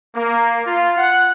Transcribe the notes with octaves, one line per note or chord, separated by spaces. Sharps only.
A#3
F4
F#5